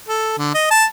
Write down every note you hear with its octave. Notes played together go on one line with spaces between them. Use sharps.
A4
D3
D#5
A5